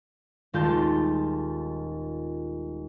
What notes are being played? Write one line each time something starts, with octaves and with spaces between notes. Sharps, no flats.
D#1 G#3 F4 A5 G6